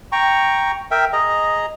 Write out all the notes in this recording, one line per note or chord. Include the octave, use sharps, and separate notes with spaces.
G5 A#5 C#6
A#4 E5 G5
G#4 D#5 A#5